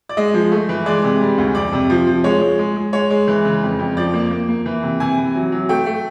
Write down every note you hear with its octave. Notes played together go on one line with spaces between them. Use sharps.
D5
G#3 D#5
F3
A3
E3
G#3 D5
C3
G3
D2
F2 D5
C3
F3
F3
G#3 C#5
G#3
G#3
G#3
G#3 C#5
G#3
E3
C#3
F2
F2
F3 D5
A#3
A#3
A#3
E3
C3
C3 G#5
E3
F#3
F#3
A3 G5
A3